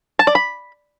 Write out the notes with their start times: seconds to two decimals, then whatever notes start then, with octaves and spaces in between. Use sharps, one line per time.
0.19 A5
0.27 D5
0.35 B5